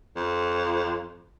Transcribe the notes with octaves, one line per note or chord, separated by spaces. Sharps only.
F2